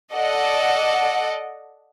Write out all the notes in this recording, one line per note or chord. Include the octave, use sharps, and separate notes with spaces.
A4 D5 D#5 F#5